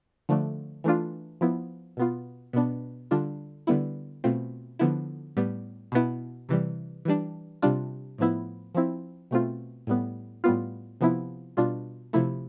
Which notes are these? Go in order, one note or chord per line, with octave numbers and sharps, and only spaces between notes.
D3 F3 A3 D4
E3 A3 D4 F4
F3 B3 E4
B2 B3 F4
B2 B3 D4
D3 G3 D4 F4
D3 G3 B3 E4
B2 A3 C4 F4
D3 F3 B3 E4
A2 G3 B3
B2 B3 E4
C3 E3 G3
E3 G3 D4
C3 G3 D4 F4
A2 F3 B3 E4
F3 C4 E4
B2 A3 C4 F4
A2 G3 B3
A2 G3 B3 F4
C3 F3 B3 E4
B2 G3 D4 F4
C3 F3 A3 E4